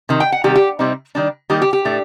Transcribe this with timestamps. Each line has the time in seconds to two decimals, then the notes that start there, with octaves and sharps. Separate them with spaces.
0.09 C3 D#3
0.20 G5
0.32 F#5
0.44 C3 D#3 G3 G4
0.56 G4
0.79 C3 G3 C4 D#4
1.15 D#3 G3 D4
1.50 D#3 G3 A#3 D#4 G4
1.62 G4
1.73 G4
1.85 A2 A3 D4